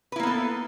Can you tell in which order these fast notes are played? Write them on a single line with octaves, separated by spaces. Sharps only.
B4 E4 A#3 B3 A4